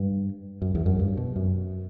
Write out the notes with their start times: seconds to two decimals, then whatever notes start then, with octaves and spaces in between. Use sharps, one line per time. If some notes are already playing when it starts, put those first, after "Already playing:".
Already playing: G2
0.62 F#2
0.75 E2
0.86 F#2
0.99 G2
1.17 B2
1.36 F#2